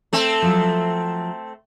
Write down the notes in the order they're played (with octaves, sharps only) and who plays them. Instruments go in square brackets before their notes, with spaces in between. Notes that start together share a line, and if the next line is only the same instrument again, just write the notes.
[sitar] A3 C4
[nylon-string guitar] F3 F#3